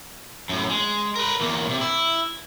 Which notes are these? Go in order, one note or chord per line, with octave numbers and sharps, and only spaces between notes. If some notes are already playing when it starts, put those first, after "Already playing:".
F#2 A2
G#3
A#4 B4
E2 A#3
C3
E4